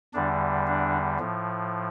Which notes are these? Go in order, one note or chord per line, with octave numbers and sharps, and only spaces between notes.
E2 D3 G3 D4
D4
A2 F3